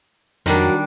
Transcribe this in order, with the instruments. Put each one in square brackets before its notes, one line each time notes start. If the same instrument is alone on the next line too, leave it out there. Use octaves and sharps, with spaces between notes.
[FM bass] F2 [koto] D#3 G3 D4 [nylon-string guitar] F#3 F#4 A#4